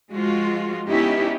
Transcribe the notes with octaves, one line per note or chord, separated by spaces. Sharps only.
F3 G#3 F4 F#4
B3 C#4 D#4 E4 G4